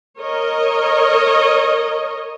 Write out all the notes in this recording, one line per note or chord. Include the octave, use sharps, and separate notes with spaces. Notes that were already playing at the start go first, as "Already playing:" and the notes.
A#4 C#5 D#5